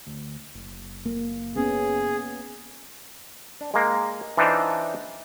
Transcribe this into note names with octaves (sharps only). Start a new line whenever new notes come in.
D2
F#1
A#3
B3 C#4 G#4
D4
G#3 A#3
E3 D4 D#4 F4 C5